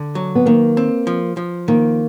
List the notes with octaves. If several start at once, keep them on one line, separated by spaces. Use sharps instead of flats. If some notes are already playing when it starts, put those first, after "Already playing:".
Already playing: D3
F#3
B3
D#3 A#3
C4
F3
F3
D#3 A#3